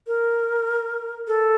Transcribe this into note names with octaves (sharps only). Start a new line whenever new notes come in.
A#4
A4